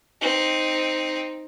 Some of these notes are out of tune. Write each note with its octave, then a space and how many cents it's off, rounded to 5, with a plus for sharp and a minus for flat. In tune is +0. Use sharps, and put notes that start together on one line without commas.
C4 +0 D#4 +0